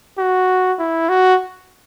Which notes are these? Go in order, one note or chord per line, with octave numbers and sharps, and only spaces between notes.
F#4
E4
F#4